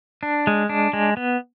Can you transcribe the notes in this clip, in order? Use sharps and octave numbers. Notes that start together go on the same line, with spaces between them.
D4
G#3
D4
G#3
B3